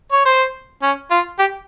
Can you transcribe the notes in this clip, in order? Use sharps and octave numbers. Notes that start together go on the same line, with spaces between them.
C#5
C5
C#4
F4
G4